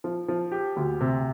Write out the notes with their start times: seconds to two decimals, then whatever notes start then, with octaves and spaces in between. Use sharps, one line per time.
0.04 F3
0.28 F3
0.52 G4
0.76 D2
1.01 C3